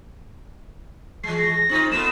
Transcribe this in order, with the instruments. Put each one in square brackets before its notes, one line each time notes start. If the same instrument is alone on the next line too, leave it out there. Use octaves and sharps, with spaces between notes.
[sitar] E3 G#3 [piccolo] C7
[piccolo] A#6
[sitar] C4 D#4 F4
[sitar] A3 B3 F4 [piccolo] E7